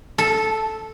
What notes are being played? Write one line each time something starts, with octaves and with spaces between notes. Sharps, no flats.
A4